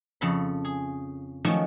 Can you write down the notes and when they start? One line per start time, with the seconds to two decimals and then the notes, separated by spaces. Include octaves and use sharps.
0.21 F2 C#3 A4 B5
0.65 G#4
1.45 D#3 F3 F#3 A3 C#4